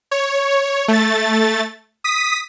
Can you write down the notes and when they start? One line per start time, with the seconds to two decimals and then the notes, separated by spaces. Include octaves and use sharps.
0.11 C#5
0.88 A3 A6
2.04 D#6 B6